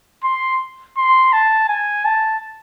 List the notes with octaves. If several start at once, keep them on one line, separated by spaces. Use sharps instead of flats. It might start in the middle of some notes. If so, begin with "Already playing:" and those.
C6
C6
A5
G#5
A5